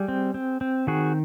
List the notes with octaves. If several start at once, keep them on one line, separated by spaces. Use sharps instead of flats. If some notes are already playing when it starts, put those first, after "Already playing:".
Already playing: G3 G#4
C4
C4
C4
D#3 F#4 G#4